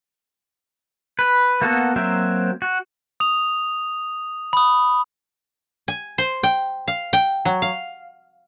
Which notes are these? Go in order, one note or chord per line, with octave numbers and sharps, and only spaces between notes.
B4
A#3 B3 F#4 A4
F#3 A#3 C4 C5 E5
F#4
D#6 F7
B5 D#6
G#5
C5
G5
F5
G5
F#3
F5